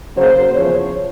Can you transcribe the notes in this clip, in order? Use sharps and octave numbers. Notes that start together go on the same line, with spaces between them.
C#3 F#3 A#3 C5
E2 C#3 F3 C#5